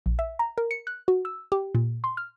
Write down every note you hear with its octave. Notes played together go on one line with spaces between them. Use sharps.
A#1
E5
A#5
A#4
C#7
F#6
F#4
E6
G4
A#2
C6
F6